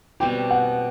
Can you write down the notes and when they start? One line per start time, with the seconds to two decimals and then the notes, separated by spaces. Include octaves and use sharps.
0.20 B2 G3 C4 G4 G5
0.50 F#5